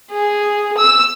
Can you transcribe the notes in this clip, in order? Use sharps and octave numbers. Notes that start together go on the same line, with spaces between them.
G#4
E6